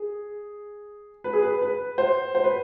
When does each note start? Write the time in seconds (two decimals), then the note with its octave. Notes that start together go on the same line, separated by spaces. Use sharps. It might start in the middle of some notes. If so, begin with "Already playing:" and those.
Already playing: G#4
1.24 B4
1.33 G#4
1.42 B4
1.62 B4
1.98 C5
2.35 C5
2.44 B4